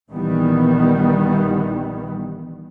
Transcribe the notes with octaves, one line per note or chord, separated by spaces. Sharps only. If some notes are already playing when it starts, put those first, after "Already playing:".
A#1 D#3 E3 G3 B3